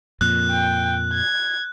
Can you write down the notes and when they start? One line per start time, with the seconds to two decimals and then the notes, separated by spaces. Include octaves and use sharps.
0.21 F2 A#2 F#6
0.51 G5
1.14 G#6